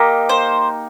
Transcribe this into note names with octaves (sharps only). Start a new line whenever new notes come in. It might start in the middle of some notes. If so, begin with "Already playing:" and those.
Already playing: A#3 D#4 G4
C5